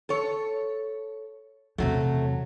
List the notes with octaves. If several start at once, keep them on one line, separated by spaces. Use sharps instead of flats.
A4 C#5
E2 C3 F#3 A3